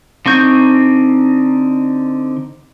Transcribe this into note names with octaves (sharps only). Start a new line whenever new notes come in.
D3 C4 D#4 C#6 G6